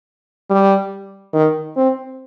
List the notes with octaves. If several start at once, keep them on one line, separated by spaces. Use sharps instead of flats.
G3
D#3
C4